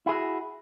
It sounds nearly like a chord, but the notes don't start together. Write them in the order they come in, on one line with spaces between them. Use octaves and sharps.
E4 G#4 F#4